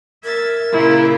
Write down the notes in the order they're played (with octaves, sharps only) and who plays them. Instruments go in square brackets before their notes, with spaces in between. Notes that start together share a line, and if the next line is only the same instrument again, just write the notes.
[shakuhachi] A#4 [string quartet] E5 G#6 A6
[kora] A#2 A#3 [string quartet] C#3 F4 [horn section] E4